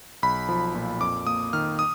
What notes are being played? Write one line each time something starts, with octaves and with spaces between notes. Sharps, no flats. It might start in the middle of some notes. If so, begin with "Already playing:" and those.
B1 B5
F3
A#2
F2 D6
A#3 D#6
D#3 F6
D#6